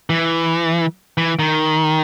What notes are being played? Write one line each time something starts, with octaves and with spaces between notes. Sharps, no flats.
E3
E3
D#3